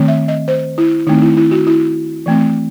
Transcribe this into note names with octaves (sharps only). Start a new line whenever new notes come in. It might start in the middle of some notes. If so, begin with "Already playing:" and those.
Already playing: D#3 A3 C4
E5
D#5
C5
E4
D#3 A3 C4 D#4
E4
E4
F#4
E4
E3 A3 C4